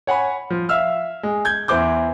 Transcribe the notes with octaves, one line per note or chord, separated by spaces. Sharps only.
C#5 F#5 G#5 B5
F3
E5 F5 E6 F6
G#3
G6 G#6
E2 E3 C5 D6 G6